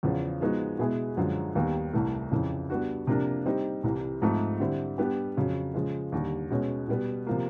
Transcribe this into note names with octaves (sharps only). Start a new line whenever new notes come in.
E2 C#3 F3
F3 G#3 B3 D#4 F#4
B2 G#3 B3 E4 G#4
F#2 D3 F3 G#3
D#2 D#3 G3 B3
C2 C3 E3 A3
F2 C#3 E3
G3 B3 D4 F#4
C3 F3 A#3 D4
G3 C4 D#4 G4
C2 C3 E3 G3
G#2 F3 A3 C4
D3 G3 C4 E4
G3 B3 D4 G4
F2 C#3 F#3
C#3 F3 G#3
D#2 D3 G3
B2 G#3 C#4
B2 G3 B3
C3 F3 A#3